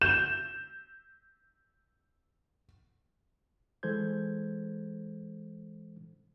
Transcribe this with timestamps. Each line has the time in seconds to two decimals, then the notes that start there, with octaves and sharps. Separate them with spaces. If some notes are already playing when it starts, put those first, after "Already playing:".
0.02 G6 E7
3.83 E3 G#3 A4 C5 G6 G#6